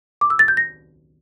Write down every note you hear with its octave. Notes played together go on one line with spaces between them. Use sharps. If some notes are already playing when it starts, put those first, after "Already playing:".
D6
E6
A6
G6
A#6